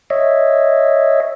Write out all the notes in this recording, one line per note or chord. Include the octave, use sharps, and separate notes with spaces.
C#5 D#5 E5